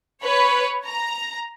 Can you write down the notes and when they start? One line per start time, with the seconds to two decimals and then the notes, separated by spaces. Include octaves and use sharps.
0.23 B4 C#5
0.86 A#5